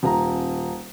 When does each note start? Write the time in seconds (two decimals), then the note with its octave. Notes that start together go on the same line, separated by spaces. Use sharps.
0.03 D#1 A#5